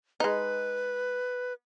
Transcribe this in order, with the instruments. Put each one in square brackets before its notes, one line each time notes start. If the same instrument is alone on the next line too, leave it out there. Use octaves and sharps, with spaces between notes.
[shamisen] G#3 D#4 [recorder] B4